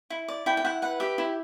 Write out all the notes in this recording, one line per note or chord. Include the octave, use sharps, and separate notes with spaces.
E4
D5
E4 G5
G5
E4 F#5
B4 F#5
G4 E5
E4